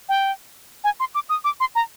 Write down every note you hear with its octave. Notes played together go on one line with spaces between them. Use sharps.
G5
G#5
C6
D6
D#6
D6
C6
A#5